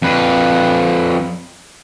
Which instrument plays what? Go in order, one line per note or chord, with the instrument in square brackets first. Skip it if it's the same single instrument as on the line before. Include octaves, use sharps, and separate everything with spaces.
[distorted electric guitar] F2 B4